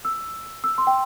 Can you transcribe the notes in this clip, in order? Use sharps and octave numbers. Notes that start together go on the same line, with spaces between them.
E6
E6
C6
G5